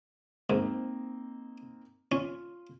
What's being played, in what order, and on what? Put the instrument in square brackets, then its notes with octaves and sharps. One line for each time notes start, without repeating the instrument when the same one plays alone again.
[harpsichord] G#2 [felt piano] A#3 C4 D#4
[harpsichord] C#4 [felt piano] F4